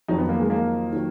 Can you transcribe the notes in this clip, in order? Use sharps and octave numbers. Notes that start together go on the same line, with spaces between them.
F2 D#3 F#3 D#4
B3
A#3
G#3
A#3
D#3 F#3